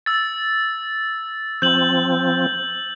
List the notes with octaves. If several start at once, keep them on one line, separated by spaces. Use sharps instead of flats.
E6 A6
F3 C4 G6 F#7